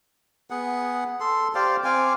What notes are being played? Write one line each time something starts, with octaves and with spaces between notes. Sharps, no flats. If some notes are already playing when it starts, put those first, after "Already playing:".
B3 G#4 F#5
A4 C6
G4 C5 D5 F5
C4 F5 G#5 D6